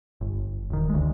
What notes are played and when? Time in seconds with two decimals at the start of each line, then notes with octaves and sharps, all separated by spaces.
0.21 G1
0.70 E1 D#3
0.90 D2 G#3